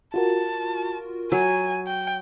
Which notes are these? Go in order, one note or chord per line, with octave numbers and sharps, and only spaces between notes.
F4 F#4 A#4 A5
F#3 G#5
G5